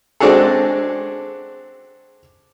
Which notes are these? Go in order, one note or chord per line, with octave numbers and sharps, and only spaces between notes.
G#3 C4 D4 F#4 G#4 A4